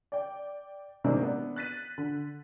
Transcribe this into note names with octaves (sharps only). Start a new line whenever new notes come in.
D5 G5
C3 D#3 G#3 A#3 C#4 D4
B3 D4
F#6 A6 B6 D#7
D3